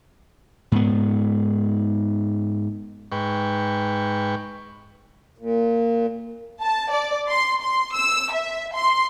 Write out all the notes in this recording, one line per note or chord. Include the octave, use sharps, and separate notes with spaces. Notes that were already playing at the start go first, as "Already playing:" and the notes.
G#2 B3
G#2 B4 G5 C#6
A#2
A5
D5
C6
C6
E6
E5
C6